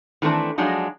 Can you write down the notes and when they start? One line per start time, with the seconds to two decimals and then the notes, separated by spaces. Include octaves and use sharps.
0.22 D#3 E3 A3 C4 D4
0.58 F3 F#3 G#3 D4 D#4